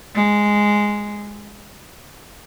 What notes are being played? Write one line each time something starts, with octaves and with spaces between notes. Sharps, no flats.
G#3